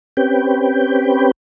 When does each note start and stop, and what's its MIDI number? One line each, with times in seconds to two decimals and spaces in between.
0.17 1.31 60
0.17 1.31 61
0.17 1.31 67
0.17 1.31 71
0.17 1.31 79